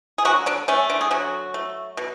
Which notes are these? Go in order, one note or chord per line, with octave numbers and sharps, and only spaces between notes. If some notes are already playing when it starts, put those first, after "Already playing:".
G#4
D3 F#3 F#4
D3 D4
A3 C#4
D3 D4
G#4
D3 F#3 F#4
A3
B2